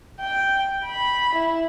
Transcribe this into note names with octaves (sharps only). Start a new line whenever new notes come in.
G5
B5
E4